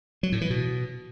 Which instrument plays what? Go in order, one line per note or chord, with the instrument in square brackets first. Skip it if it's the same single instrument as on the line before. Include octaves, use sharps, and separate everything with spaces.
[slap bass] F#3
A2
E3
B2